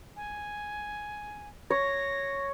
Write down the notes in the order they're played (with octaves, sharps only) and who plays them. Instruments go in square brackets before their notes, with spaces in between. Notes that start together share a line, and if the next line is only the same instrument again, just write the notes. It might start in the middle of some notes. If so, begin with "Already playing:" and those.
[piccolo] G#5
[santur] C#5 [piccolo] A#6